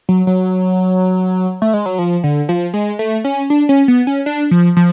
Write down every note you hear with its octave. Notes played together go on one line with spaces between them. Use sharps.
F#3
F#3
A3
G#3
F#3
F3
D3
F3
G#3
A3
C#4
D4
C#4
B3
C#4
D4
F3
F3